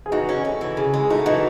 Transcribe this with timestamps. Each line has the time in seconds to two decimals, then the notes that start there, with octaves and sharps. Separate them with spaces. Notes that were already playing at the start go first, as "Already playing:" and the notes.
0.06 G#4
0.12 E3 D#4 F#4
0.29 C#4
0.45 A3
0.61 E3
0.77 C#3
0.94 G#3
1.10 A3 D#4 F#4
1.26 E3 D#4 F#4